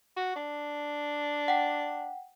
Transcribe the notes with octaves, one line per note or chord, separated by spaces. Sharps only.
F#4
D4
F#5 G5